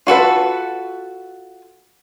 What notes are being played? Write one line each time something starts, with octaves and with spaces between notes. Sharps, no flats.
F4 F#4 A4 B4